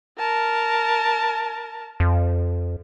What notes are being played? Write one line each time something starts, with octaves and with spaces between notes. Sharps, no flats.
A#4 A5
F2